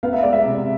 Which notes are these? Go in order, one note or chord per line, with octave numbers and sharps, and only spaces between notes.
B3 F5
E5
G#3 D5
E5
C3